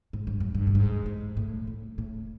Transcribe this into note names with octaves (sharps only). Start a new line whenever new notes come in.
G#2
G2
F#2
G2
A2
G#2
G#2
A2
A2
A2